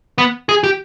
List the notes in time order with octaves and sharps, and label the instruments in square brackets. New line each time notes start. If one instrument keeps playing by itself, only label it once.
[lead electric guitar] B3
G#4
G4